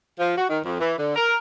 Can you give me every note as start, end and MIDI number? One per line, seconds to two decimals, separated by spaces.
0.19 0.33 53
0.37 0.48 66
0.49 0.59 51
0.63 0.80 41
0.80 0.94 52
0.98 1.13 50
1.16 1.36 70